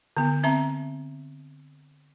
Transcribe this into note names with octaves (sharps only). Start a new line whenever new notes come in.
D3 B3
C4 E5 A5 A#5